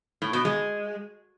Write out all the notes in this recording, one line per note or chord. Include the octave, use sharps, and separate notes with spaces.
A2
B2
G#3